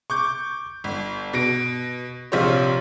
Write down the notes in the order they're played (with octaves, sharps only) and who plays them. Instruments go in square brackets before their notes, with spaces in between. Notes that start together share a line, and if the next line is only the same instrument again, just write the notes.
[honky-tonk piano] C#6 D6 G6
G1
B2 A#6 D7
A#1 C3 F4 C5 C#5